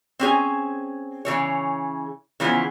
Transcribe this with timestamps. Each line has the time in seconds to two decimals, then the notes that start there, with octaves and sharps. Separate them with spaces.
0.19 C4 C#4 G#4
1.25 C#3 E3 C#5
2.40 C#3 E3 F3 B3